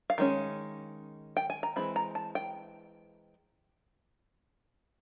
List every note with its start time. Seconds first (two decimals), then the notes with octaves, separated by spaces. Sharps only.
0.10 F5
0.18 D#3 G#3 C#4
1.37 G5
1.50 G#5
1.63 A#5
1.76 E3 G#3 C4 B5
1.96 A#5
2.15 A5
2.35 G5